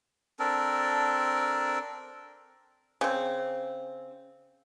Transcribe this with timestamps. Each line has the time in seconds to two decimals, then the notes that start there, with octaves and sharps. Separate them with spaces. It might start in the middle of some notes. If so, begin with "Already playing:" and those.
0.39 C4 D4 A4 A#4
3.01 C#3 C4